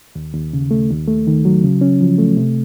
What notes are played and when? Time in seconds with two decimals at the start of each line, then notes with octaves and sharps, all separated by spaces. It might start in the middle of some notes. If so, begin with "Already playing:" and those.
0.16 D#2
0.34 D#2
0.53 C#3
0.71 A3
0.90 D#2
1.08 A3
1.27 D#3
1.45 F#3
1.64 C#3
1.81 C#4
2.01 F3
2.18 A3
2.37 C3